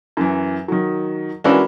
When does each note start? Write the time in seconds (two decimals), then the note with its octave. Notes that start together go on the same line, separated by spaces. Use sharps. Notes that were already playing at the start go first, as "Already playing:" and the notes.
0.17 F#2 E3
0.68 D#3 F#3
1.44 E3 G#3 C#4 D4 F#4 A#4